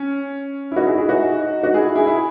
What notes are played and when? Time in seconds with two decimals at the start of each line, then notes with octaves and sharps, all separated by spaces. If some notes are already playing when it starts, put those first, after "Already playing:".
Already playing: C#4
0.72 E4
0.76 D#4 F#4
0.87 E4 G#4
0.98 E4 G#4
1.09 D#4 F#4
1.63 D#4 F#4
1.74 E4 G#4
1.95 E4 G#4
2.07 E4 G#4